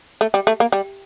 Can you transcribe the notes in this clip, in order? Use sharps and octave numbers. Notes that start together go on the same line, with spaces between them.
A3
G3
A3
A#3
G3